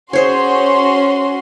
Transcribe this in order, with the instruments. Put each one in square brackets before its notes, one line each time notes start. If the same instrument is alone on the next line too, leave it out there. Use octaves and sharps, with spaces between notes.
[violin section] C#4 F#4 C6 [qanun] G#4 C5 C#5